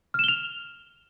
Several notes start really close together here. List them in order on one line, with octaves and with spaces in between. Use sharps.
F6 E7 G7 F7